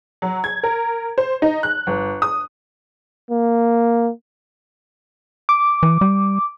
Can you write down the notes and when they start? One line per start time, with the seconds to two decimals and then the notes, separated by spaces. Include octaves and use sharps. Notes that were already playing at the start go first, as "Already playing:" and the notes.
0.22 F#3
0.44 G#6
0.63 A#4
1.18 C5
1.42 D#4
1.63 F#6
1.87 G1
2.22 D#6
3.31 A#3
5.49 D6
5.83 E3
6.01 G3